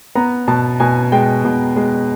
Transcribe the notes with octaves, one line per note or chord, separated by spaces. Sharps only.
B3 A#5
B2 A5
B2 G#5
G#3 G5
B2
G#3